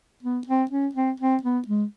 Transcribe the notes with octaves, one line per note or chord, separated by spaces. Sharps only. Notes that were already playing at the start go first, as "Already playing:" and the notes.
B3
C4
C#4
C4
C4
B3
G#3